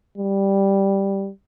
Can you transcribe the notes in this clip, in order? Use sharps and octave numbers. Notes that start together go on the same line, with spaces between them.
G3